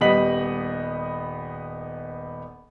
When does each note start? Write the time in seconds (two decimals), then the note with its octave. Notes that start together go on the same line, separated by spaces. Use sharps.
0.01 D#1 G3 B3 D#5 B6 F#7